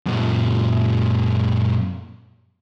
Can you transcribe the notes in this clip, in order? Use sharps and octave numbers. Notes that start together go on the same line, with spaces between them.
F#2 A#2